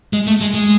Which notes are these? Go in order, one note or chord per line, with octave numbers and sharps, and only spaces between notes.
G#3
A3
G#3
G#3